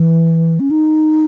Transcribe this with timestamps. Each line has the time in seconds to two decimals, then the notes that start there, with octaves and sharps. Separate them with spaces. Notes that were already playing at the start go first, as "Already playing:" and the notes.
Already playing: E3
0.60 C#4
0.71 D#4